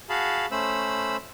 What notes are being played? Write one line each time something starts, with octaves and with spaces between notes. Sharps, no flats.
F#4 G#4 F5 A5 B5
A3 C#4 C5 B5 E6